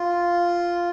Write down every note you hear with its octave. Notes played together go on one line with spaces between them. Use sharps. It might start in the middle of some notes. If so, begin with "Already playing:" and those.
Already playing: F4